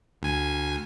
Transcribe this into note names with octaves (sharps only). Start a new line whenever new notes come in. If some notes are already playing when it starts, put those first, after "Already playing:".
D2 G#5